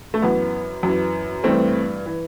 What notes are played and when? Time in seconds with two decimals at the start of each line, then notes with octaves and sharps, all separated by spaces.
0.14 A3
0.22 F#2 E3 B3
0.83 F#2 E3
1.43 G2 E3 A3 C4
2.06 E3